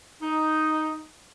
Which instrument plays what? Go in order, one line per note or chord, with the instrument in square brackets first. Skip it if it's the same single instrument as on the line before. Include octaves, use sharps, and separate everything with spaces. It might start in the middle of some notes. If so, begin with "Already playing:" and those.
[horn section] D#4